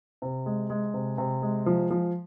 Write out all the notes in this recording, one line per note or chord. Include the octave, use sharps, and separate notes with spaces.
C3
G#3
G#3
C3
C3
G#3
F3
F3